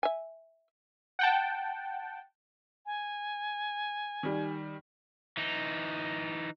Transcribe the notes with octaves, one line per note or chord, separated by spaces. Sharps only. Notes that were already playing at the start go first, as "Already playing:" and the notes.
E5 G#5
F#5 G5 A5
G#5
D#3 G3
E3 D#4